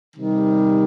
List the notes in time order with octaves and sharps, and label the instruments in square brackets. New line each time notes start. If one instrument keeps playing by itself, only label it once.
[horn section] C3 D#3 G3